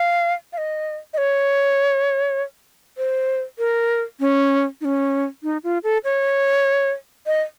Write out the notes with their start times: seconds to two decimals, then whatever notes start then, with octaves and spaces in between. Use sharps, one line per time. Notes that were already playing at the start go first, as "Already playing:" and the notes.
Already playing: F5
0.53 F5
0.58 D#5
1.14 D#5
1.18 C#5
2.98 C5
3.59 A#4
4.20 C#4
4.81 D#4
4.85 C#4
5.43 D#4
5.64 F4
5.84 A4
6.04 C#5
7.26 D#5